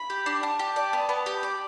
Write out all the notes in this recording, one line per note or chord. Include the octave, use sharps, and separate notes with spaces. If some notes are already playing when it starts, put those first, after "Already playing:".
Already playing: B5
G4
D4
D4 A5
G4
D5
B3
B3
G4
D5